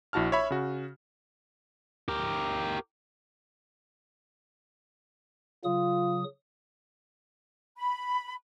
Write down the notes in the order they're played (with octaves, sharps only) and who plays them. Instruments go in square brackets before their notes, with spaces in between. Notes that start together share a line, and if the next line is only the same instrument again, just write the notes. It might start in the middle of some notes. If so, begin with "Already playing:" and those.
[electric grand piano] A#1 E4 F#4 A5 F6
C#5 E5 B5
C#3 F#4
[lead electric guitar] G4 A#4
[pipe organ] C#3 F#3 D#6 [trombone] F4
[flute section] B5